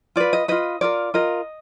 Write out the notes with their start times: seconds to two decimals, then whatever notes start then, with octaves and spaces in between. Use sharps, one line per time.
0.16 F4 B4 D5
0.33 D#5
0.48 F4 B4 D#5
0.81 F4 A#4 D5
1.14 F4 A#4 D#5